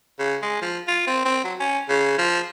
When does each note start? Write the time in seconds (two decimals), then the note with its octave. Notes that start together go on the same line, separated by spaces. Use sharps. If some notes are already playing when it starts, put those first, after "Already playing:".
0.19 C#3
0.42 G#3
0.62 F3
0.88 F4
1.07 C4
1.25 C4
1.44 F#3
1.60 C#4
1.89 C#3
2.18 F3